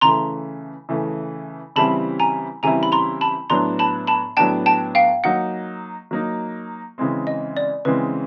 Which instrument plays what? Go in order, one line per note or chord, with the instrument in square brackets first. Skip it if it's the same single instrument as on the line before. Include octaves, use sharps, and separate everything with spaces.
[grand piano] C#3 E3 A3 [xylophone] A#5 C6
[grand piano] C#3 E3 A3
[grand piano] C#3 E3 G3 C4 E4 [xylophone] A5 B5
[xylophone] G#5 A#5
[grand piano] C#3 E3 G3 C4 E4 [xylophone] G#5 A#5
[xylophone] B5
A#5 C6
A5 B5
[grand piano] A2 F#3 B3 D4 [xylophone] A#5 C6
[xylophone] A5 B5
A5 B5
[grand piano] A2 F#3 B3 D4 [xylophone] G5 A5
[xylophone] G5 A5
F5 G5
[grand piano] F#3 A#3 D#4 [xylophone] F#5
[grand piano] F#3 A#3 D#4
C#3 E3 G#3 C4
[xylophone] D#5
D5
[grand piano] C#3 E3 G#3 C4 [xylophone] B4